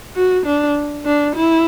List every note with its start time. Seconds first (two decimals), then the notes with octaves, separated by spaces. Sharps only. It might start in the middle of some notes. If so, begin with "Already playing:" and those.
0.16 F#4
0.46 D4
1.05 D4
1.36 E4